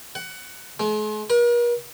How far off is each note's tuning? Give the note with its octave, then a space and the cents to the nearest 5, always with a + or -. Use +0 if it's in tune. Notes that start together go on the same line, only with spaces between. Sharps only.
F#5 +20
G#3 +45
A#4 +45